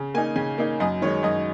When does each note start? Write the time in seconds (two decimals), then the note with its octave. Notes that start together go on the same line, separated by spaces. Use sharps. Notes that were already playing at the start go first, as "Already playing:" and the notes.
Already playing: C#3
0.14 A#3 G#5
0.18 D#4
0.36 C#3 G#5
0.58 A#3 D#4
0.80 F#2 D#5
1.02 D#3 G#3 D#4 C#5
1.23 F#2 D#5